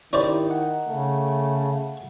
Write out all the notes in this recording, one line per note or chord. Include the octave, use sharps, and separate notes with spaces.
D#3 C#4 E4 G4 C5 D5
F#5
C#3 A3